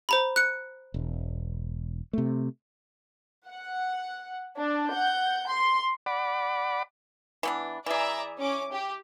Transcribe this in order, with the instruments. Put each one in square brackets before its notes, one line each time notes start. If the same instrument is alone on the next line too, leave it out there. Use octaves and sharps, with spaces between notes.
[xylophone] C5 A#5 B5
F#6 C#7
[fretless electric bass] E1
C3 A3
[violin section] F#5
D4
F#5 G6
C6
[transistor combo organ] D5 F#5 B5 D6
[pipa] E3 B3 D4
[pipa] E3 G#4 [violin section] D5 E5 A#5
[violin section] C#4 D6
G4